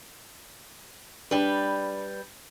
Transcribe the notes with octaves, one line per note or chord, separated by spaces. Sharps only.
G3 D4 B4